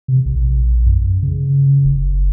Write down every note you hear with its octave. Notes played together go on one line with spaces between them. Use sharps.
C3
A#1
F#2
C#3
F#1